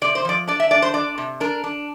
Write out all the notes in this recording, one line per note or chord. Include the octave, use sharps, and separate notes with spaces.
C3 D5
C5
F3 D5
D4 D5
E5
D4 D5
C5
D4 D5
C3
D4 A#4
D4